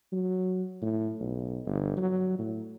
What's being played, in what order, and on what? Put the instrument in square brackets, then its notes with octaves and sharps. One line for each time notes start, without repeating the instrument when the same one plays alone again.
[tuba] F#3
A2
B1
G1
F#3
A2